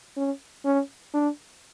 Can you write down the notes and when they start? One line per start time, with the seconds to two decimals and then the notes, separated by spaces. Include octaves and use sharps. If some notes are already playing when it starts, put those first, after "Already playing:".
0.17 C#4
0.65 C#4
1.14 D4